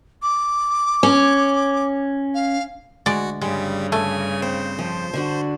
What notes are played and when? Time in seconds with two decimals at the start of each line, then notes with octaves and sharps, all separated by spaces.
0.22 D6
1.03 C#4
2.34 F5
3.06 D2 G#3 F#4 D5
3.41 G2 C#3 G3 G#3
3.92 A3 G#5
4.42 C4 C5
4.79 F2 F3
5.13 D3 D4 F#4